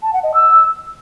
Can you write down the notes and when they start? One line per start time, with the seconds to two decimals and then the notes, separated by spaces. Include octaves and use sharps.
0.03 A5
0.13 F#5
0.23 D#5
0.34 E6